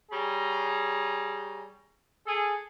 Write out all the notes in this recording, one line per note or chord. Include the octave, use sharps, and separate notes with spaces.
G3 G#4 C#5 A#5
G#4 A4